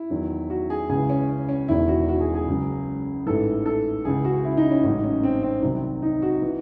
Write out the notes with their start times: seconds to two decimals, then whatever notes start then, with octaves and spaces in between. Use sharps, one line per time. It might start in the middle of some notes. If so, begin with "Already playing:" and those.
Already playing: E4
0.10 E2 D#3 F#3
0.50 F#4
0.70 G#4
0.89 C#2 C#3 E3 G#4
1.09 C#4
1.29 C#4
1.49 C#4
1.68 E1 E2 D#3 E4
1.88 F#4
2.08 F#4
2.21 G#4
2.34 G#4
2.47 C#2 C#3 F#3
3.26 A1 G#2 E3 A4
3.66 A4
4.05 C#2 C#3 E3 G#4
4.25 F#4
4.45 E4
4.57 D#4
4.71 C#4
4.84 A1 G#2 F#3 D#4
5.04 C#4
5.24 C4
5.43 C4
5.62 C2 C3 D#3 F#3
6.02 D#4
6.22 F#4
6.42 E3